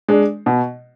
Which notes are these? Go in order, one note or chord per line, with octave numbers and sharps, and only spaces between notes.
G#3 D4
B2